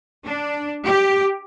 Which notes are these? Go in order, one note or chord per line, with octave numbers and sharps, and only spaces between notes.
D4
G4